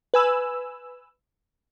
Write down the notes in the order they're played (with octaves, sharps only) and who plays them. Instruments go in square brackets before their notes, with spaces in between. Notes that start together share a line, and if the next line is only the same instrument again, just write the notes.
[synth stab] B4 G#5 E6